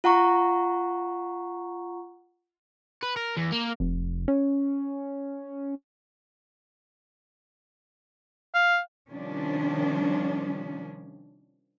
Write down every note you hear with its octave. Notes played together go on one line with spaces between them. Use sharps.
F4 F#5 A#5 C#6
B4
A#4
E2
A#3
F1
C#4
F5
C3 D#3 F3 G3 C#4 D4